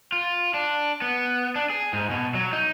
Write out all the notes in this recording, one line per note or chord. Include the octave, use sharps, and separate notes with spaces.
F4
D4
B3
D4
G#4
G#2
B2
F#3
D#4